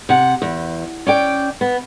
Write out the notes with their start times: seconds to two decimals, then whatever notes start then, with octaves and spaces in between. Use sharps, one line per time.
0.09 C3 F#5
0.42 E2
1.07 C#4 D5 G5
1.61 B3